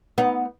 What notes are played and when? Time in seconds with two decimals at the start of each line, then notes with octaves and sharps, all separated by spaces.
0.18 B3 D#4